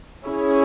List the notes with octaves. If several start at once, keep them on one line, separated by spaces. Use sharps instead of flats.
C#4 E4 G#4 C#5